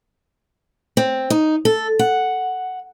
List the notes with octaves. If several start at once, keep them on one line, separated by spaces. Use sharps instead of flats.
C4
D#4
A4
F#5